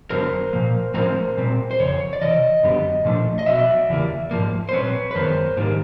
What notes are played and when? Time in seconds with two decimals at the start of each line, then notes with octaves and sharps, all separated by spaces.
0.10 F#2 D3 F#3 B3 A#4 C5
0.53 A#2 F3 A#3
0.94 A2 F3 G#3 C4 A#4 C5
1.37 A#2 G3 C4
1.71 C5
1.79 F2 C#3 C#5
2.13 D5
2.21 C3 E3 D#5
2.63 F#2 D3 G3 B3
3.05 A#2 F3 A3 D4
3.39 D#5
3.46 B2 F#3 B3 D5 E5
3.89 E2 C#3 E3 G3 A#3
4.31 G#2 F3 A#3
4.69 C5
4.72 A#2 G3 C4 B4 C#5
5.11 B4
5.15 F#2 D#3 G#3 B3 A#4 C5
5.57 G#2 D#3 G3 A#3